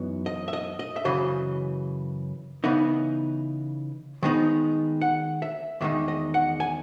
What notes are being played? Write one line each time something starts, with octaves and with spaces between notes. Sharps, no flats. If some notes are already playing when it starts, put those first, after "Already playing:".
Already playing: F#2 E3 B3 D#4
D#5
E5
D#5
D#5
E5
F#2 C#3 E3 D#5
C#3 E3 B3 D#4 E5
D#3 G#3 B3 D#4
F#5
E5
E2 D#3 G#3 D#4 E5
D#5
F#5
G#5